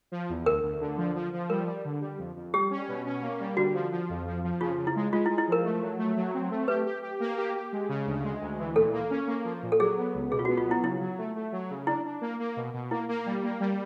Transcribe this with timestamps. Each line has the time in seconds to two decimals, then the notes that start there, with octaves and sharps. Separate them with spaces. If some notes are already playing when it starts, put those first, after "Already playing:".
0.12 F3
0.29 E2
0.46 D2 A#4
0.63 D2
0.81 D3
0.97 F3
1.15 F3
1.33 F3
1.50 G3 A#4
1.67 G3
1.85 D3
2.01 G3
2.18 F2
2.36 F2
2.53 G3 G4
2.71 C#4
2.88 B2
3.06 C#4
3.22 A#3
3.40 G3
3.57 D3 F#4
3.74 F3
3.92 F3
4.09 F2
4.27 F3
4.44 F3
4.61 C#3 F4
4.78 C#3
4.87 E4
4.96 G#3
5.12 G#3 F4
5.26 E4
5.30 G#3
5.38 E4
5.48 F3 A#4
5.65 A3
5.82 F#3
5.99 A3
6.16 F#3
6.34 C4
6.51 A3
6.68 G4 B4
6.86 G4
7.02 G4
7.20 A#3
7.37 G4
7.55 G4
7.73 G#3
7.89 C#3
8.06 D2
8.24 G#3
8.41 D2
8.58 E3
8.76 A#2 A4
8.93 A#3
9.10 C#4
9.27 A#3
9.45 F3
9.62 A#2
9.72 A4
9.80 F#3 G#4
9.97 B3
10.14 C#2
10.32 B2 G#4
10.39 F4
10.45 B3 F#4
10.57 F4
10.66 F#3
10.71 E4
10.83 C#3 E4
11.00 F#3
11.18 A3
11.35 A3
11.52 F#3
11.70 C#3
11.87 D4 E4
12.05 D4
12.21 A#3
12.40 A#3
12.57 B2
12.74 B2
12.91 A#3 E4
13.09 A#3
13.26 G3
13.44 A#3
13.60 G3